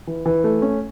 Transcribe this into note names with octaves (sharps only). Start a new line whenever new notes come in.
E3
E3
A3
C#4